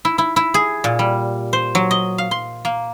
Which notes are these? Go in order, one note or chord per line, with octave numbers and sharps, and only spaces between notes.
E4
E4
E4
G#4
A#2
G3
C5
F#3
D#5
F5
C6
A#3